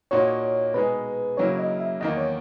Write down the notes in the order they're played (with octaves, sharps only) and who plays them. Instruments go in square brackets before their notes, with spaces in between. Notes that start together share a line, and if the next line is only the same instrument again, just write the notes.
[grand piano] A#2 A#3 D#4 F#4 [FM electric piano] C#5
[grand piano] B2 G#3 D#4 G#4 [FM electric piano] B4
[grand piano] C#3 F#3 A#3 E4 [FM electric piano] C#5
[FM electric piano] D#5
E5
[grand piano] E2 D#3 A#3 [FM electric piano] D#5
[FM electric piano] C#5